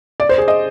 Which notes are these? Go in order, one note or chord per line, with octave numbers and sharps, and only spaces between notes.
D5
C5
G#4
D#5